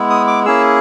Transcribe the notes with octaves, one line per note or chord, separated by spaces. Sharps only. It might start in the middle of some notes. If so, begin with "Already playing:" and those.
Already playing: G#3 B3 E4
D#6
D6
A#3 C#4 E4 G#4 E6